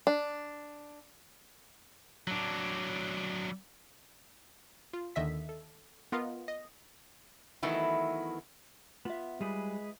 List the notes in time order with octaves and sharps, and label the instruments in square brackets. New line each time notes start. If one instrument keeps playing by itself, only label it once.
[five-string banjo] D4
[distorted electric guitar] F#3 D4
[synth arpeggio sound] F4
D#2 D3 D#3 D#5 E5 B6
A4
B3 F4 A#4 D#5 F5
D#5
[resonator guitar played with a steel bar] D#3 E3 F#3 A3 B3 E4
[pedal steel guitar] B3 [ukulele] F4 E5
[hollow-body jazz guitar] G3 [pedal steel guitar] G#3 G#4 B4